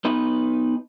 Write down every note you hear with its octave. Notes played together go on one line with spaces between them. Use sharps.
B3 D#4 B4